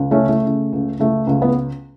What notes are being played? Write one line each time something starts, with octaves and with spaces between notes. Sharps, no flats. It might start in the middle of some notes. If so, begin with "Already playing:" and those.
Already playing: C#2
A3 C#4
C#3
A3
C#3
C#2
C#2 A3
C#2
B3